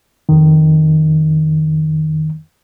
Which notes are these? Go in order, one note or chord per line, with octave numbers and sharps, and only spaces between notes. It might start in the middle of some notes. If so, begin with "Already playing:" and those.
F2 D#3